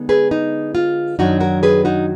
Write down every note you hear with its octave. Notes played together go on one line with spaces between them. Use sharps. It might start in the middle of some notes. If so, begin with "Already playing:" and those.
Already playing: D3 G#3 B3 D#4
G#4 B4
D#4
F4
F#2 D#3 F#3 D4 D#4 F#4
F#4 A#4
G#4 B4
D#4 F#4